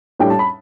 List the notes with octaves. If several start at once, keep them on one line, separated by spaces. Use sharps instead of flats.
A2 G3 D4 G5
A5
B5